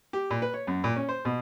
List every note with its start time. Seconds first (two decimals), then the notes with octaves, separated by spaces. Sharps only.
0.13 G4
0.31 A#2
0.42 B4
0.54 C#5
0.67 F#2
0.84 A#2
0.96 C#4
1.09 C5
1.25 B2